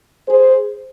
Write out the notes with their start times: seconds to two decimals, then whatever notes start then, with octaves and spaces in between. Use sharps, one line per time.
0.28 G#4 C5